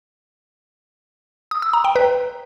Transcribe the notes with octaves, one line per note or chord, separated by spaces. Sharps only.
D#6
E6
A#5
G5
B4